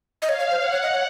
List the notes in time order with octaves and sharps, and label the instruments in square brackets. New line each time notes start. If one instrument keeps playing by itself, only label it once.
[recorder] D#5
[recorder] C#5 [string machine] F5
[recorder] C#5
C5
[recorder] C#5 [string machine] F#5
[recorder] C#5
D#5
C#5